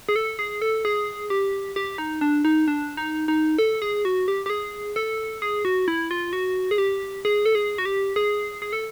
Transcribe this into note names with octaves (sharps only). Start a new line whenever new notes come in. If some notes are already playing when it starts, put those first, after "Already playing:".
G#4
A4
G#4
A4
G#4
G4
G4
D#4
D4
D#4
D4
D#4
D#4
A4
G#4
F#4
G4
G4
G#4
A4
G#4
F#4
E4
F4
F#4
G#4
G4
G#4
A4
G#4
F#4
G4
G#4
G#4
A4